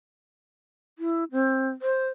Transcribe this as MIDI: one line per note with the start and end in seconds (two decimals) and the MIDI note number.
0.99 1.24 64
1.32 1.69 60
1.82 2.09 72